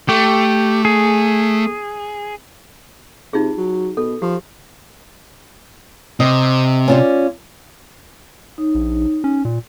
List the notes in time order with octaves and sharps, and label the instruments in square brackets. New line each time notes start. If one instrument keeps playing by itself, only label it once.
[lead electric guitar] A3 [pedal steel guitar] G4
[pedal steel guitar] G#4
[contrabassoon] C3 [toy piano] D#4 F4 G#4
[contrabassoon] F#3
[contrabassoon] B2 [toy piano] A4
[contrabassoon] F3 [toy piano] G4
[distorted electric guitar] C3 [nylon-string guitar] D#5
[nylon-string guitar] C#4 F4 D5
[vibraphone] D#4 C#5
[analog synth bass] A#1
C#4
A#2